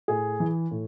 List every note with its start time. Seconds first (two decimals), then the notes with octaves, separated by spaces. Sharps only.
0.08 A2 G#4
0.40 E3
0.71 A2